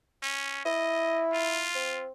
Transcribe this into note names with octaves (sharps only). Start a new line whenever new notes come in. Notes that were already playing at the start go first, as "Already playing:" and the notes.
C#4
E4 D#5
F4
C4